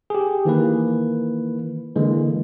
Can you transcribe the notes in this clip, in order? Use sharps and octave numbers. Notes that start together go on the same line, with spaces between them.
G4 G#4
D#3 E3 A#3 B4
D3 E3 G#3 A#3